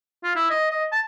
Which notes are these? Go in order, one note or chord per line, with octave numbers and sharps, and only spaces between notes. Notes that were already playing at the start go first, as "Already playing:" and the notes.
F4
E4
D#5
D#5
A5